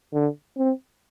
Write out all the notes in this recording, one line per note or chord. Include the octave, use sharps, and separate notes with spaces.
D3
C4